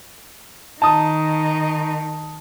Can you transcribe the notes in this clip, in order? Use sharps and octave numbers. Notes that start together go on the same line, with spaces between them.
D#3 D#4 A5 D#6